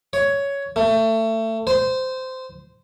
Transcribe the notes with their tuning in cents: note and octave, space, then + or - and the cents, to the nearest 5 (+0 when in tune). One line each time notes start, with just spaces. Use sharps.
C#5 +10
A3 +25
C5 -15